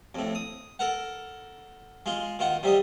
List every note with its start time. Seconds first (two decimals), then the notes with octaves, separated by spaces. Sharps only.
0.15 F2 A2
0.35 D#6
0.79 A4 A#4 F#5
2.06 G#3 F4
2.39 D#3 F4 F#5
2.63 C3 G3 D#5